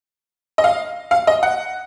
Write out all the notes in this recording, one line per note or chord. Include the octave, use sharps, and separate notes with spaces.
D#5
F5
F5
D#5
F#5